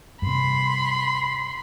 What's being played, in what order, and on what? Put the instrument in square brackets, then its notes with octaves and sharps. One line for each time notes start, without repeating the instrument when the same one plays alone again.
[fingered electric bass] G2 C3 [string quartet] B5 C6